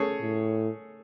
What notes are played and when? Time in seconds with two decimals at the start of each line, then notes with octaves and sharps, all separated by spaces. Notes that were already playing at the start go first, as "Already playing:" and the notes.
Already playing: A3 C#4 G#4 C#5
0.21 A2